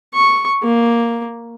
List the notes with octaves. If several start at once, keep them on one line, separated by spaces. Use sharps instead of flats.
C#6
A#3